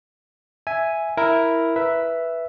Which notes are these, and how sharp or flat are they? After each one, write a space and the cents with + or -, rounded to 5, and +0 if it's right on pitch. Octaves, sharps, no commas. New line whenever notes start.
E5 +0 G#5 +0
E4 +0 A#4 +0
B4 +0 E5 +0